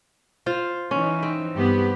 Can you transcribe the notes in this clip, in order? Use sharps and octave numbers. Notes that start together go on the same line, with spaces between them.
F4 C5
E3 C#4 D#4
C4
G2 B3 G4